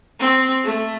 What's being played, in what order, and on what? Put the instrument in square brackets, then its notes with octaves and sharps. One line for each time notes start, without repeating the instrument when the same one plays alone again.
[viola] C4
A3